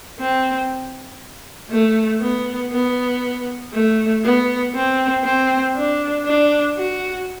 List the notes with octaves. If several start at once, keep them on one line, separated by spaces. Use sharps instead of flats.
C4
A3
B3
B3
A3
B3
C4
C4
D4
D4
F#4